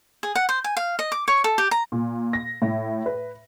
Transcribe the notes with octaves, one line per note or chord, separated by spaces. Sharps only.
G#4
F#5
C5
G#5
F5
D#5
D6
C#5
A4
G4
A#5
A#2
A#6
A2
B4